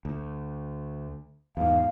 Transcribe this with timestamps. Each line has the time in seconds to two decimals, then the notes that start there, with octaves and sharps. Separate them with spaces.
0.05 D2
1.57 E2 G#2 F5